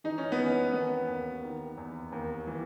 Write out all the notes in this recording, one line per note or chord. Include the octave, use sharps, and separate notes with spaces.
E3 D#4
C#4
B3
E3
C#4
D#3 B3
D#2
D#3
E2
D#2
E3